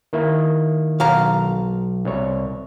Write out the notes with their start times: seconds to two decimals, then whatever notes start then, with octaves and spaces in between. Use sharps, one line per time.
0.13 D#3 A#3 E4
1.00 B1 F5 A#5
2.05 C2 C#5